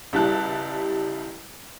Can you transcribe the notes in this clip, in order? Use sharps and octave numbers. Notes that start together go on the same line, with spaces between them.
C#2 G3 E4 A5 F#6